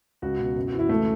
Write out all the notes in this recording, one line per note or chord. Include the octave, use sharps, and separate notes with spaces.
C#2 F#4
B2
F#2
F#4
E3
E4
C#2 A3